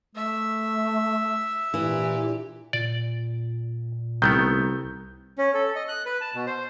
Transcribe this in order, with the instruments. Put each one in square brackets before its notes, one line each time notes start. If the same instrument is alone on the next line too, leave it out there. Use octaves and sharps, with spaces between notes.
[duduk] A3 [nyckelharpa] E5
[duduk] A#2 [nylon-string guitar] E3 [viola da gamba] D4 G4
[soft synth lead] A#2 [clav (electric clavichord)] D5
[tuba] C2 [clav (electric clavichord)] D#3 A3 B3 [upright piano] G6
[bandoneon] C#4
A4
D#5
F#6
B4
A5
B2
C5